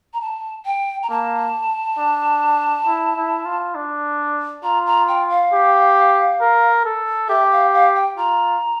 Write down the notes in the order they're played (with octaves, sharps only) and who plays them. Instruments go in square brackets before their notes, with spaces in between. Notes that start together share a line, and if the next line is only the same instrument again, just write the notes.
[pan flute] A#5
A5
G5
A#5
[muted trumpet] A#3 [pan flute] A5
[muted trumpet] D4
E4
E4
F4
D4
[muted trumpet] F4 [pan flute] A#5
[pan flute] A#5
G5
F5
[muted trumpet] G4
A#4
A4
[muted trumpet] G4 [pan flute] E5
[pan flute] F5
F5
G5
[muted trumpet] F4 [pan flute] A#5